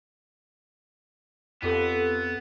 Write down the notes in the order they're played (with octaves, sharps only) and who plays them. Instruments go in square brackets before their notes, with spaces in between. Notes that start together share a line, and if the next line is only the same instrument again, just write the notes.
[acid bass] F2 [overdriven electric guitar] B3 [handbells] F4 G4 A4